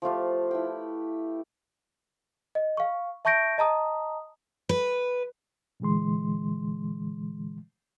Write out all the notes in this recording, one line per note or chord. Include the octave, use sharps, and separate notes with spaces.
F3 A3 F4 G4
E4 B4 G5
D#5
F5 C#6
E5 A5 C#6 G6 A#6 D7
D#5 A5 A#5 D#6
B4
A#2 D3 E3 G#3 C6